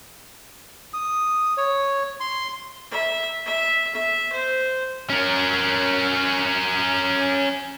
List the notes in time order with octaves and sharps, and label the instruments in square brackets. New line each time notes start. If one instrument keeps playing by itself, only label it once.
[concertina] D#6
C#5
C6
[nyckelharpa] E5
E5
E5
C5
[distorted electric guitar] C#4 A#4